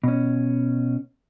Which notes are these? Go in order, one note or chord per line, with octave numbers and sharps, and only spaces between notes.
B2 C#4